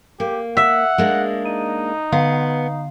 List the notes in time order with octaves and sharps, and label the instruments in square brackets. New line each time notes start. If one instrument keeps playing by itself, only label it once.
[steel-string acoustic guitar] A#3 [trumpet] G4
[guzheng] E5 [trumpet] F#5
[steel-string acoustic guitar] G#3 A#3 D4
[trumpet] D#4 [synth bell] D#7
[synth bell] D3 F5 C7 [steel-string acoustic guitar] B3